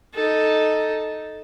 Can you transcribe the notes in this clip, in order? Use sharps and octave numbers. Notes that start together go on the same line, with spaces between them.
D#4 A4